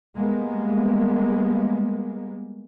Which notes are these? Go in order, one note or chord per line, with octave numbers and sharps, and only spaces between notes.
G3 G#3 A#3 B3